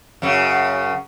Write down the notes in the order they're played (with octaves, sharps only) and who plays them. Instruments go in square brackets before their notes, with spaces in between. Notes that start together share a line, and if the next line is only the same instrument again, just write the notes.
[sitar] F#2 C#3